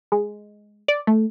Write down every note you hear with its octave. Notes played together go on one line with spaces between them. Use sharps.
G#3
D5
A3